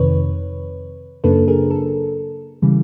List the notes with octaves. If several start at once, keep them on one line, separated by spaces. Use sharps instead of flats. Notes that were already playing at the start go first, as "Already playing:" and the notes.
Already playing: F2 C3 D#3 B4 C#5
F#2 C#3 F#3 A#3 D4 A4 B4
G#4 A#4
A4
C#3 E3 G3